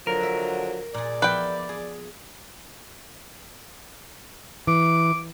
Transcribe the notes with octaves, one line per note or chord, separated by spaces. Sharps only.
D3 F3 F#3 A#4
E5
A#2 G#4 D5
F3 B3 E4 B4 G5
G#4
E3 D6